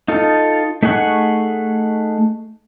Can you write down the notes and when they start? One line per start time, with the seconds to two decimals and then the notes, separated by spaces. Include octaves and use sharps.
0.08 D#4 F4 A4
0.82 A3 D#4 G#4 F#5 C#6